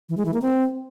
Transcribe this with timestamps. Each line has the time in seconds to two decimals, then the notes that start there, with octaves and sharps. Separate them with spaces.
0.09 E3
0.17 G#3
0.25 E3
0.34 A#3
0.42 C4